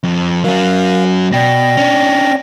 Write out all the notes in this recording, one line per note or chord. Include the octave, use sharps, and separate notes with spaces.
F2
F#3 C#4 A#4 F5
B2 D5 G5 A#6
C#4 D4